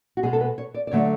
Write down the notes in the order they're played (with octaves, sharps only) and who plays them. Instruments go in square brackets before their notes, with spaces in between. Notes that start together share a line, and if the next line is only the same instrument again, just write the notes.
[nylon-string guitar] F#4
B2 G#3 G#4
A4
B4
C#5
D5
D5
D3 F#3 A3 C#5